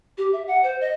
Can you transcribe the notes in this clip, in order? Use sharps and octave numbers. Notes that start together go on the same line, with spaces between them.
G4
E5
F#5
C5
D#5